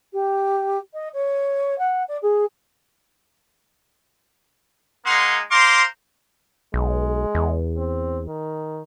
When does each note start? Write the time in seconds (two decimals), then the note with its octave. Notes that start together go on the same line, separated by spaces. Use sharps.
0.13 G4
0.93 D#5
1.13 C#5
1.78 F#5
2.08 D5
2.22 G#4
5.05 G#3 A#3 D#4 F#5 C6
5.50 C5 F5 A#5 C6 D6
6.74 B1 G#3
7.35 E2
7.77 C4
8.27 D#3